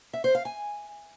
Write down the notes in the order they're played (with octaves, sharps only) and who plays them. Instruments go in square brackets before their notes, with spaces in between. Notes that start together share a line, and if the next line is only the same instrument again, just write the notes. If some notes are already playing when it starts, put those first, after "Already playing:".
[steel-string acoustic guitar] E5
C5
F5
G#5